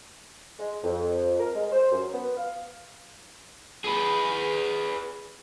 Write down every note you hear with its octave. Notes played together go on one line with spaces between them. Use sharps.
G#3
F2
A#4
G#3
C5
F#2
B3
F5
G#4 B4